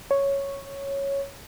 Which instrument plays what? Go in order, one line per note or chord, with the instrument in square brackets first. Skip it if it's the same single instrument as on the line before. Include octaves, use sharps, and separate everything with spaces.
[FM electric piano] C#5